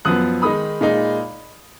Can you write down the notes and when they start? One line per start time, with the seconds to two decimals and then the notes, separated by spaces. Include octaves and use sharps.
0.05 F#2 F3 B3 D#6 F#6
0.42 D#3 G#3 D#4 B5 D#6
0.81 A#2 G#3 D#4